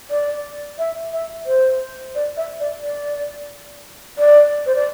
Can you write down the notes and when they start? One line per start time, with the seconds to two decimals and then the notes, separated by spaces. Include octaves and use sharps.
0.10 D5
0.79 E5
1.13 E5
1.46 C5
2.15 D5
2.37 E5
2.60 D5
2.83 D5
4.18 D5
4.66 C5
4.75 D5